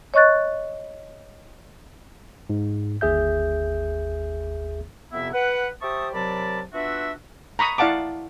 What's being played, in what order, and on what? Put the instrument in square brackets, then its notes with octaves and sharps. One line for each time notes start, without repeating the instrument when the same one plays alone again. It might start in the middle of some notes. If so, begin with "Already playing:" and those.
[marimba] C#5 D#5 C#6 F#6 A6
[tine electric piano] G#2
G1 D#2 G#4 E5 G6
[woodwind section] F2 C3 B3 E4 E5
B4 F#5
G4 C5 E5 A5 C#6 D#6
C3 F#3 A#4 D5 A5 B5
B3 D4 F4 F#4 E5
[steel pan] A#5 B5 C#6 D#6
E4 D5 F5 F#5 A5 D6